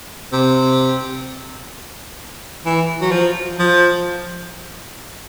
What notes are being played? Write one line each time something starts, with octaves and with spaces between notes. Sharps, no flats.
C3
E3
F#3
F3
F3